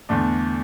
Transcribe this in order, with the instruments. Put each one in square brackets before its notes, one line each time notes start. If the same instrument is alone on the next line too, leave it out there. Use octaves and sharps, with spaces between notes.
[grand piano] E2 D3 A3 D4